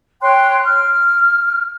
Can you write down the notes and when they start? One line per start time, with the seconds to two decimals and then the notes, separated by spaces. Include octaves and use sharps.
0.21 C#5 G5 C6 F#6
0.64 F6